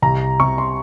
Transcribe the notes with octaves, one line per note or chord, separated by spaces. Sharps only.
C2 A#5
C3 C#6
C6